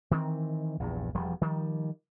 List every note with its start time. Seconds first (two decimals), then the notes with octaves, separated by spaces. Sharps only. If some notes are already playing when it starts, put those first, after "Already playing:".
0.11 D#3 E3 B3 C4
0.80 A#1 E2 G2
1.15 E1 F3 G3
1.41 D#3 F3 G3